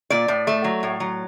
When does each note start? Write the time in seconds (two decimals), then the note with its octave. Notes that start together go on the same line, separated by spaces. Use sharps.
0.10 A#2 D5
0.28 A2
0.47 A3
0.64 F#3
0.83 A2
1.00 F#3